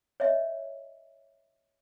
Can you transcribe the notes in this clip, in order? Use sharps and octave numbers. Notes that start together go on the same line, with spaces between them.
C#5 D#5 E5